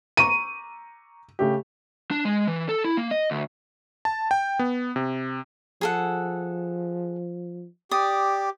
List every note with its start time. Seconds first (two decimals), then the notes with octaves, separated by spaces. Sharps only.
0.17 A#5 C#6 D#7
1.39 C#3 A3 G4
2.11 D4
2.25 G#3
2.48 E3
2.69 A4
2.85 E4
2.97 A#3
3.11 D#5
3.31 D2
4.05 A5
4.31 G5
4.59 B3
4.96 C3
5.81 F3 G#4 A4 F#5
7.91 G4 D5 D#6